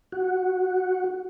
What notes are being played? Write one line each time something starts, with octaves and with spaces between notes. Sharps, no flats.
F#4